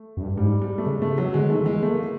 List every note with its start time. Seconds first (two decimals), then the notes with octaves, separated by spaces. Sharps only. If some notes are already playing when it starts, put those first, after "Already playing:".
Already playing: A3
0.17 F#2
0.22 G2
0.37 G#2 G3
0.62 G3
0.78 A3
0.86 C#3 G#3
1.02 A3
1.18 F#3
1.34 D3 G#3
1.49 D#3 A3
1.66 E3 G#3
1.82 A3 A#3